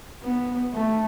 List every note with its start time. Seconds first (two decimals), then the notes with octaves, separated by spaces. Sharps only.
0.23 B3
0.74 A3